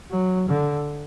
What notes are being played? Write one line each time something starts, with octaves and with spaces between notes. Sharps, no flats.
F#3
D3